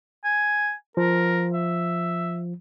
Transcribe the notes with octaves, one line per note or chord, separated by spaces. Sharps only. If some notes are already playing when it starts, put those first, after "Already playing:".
G#5
F3 A#4
E5